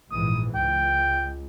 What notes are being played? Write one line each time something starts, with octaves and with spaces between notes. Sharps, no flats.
A#1 G#2 E3 D#6
C#2 G5